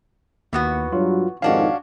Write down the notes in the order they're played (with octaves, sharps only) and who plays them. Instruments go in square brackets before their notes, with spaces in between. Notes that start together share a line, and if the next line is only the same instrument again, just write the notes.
[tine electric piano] D#2 [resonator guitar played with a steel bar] E3 B3 F#4
[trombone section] G2 F#3 [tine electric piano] F4
[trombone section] F2 G#2 D#3 [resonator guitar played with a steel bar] C#4 D4 F#4 [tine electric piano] F5